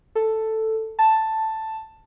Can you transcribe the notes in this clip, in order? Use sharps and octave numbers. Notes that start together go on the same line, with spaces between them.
A4
A5